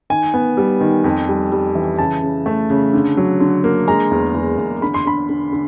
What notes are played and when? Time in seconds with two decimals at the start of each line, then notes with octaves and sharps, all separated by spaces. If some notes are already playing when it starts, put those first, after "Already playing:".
0.10 D#3 G#5
0.34 B3
0.57 G3
0.81 D#3
1.04 F2
1.28 G3
1.52 G3
1.75 E3
1.98 C#3 A5
2.22 C#3
2.46 A3
2.70 C#3
2.93 D3
3.17 F#3
3.40 D3
3.64 A#3
3.88 G#3 A#5
4.11 E2
4.34 E2
4.58 E2
4.82 D3 B5
4.94 C6
5.06 D3 B5
5.29 D3
5.52 D3